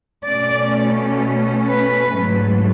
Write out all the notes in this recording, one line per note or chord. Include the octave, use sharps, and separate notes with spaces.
B2 A3 C#4 D5
B4
G#2 F#3 A3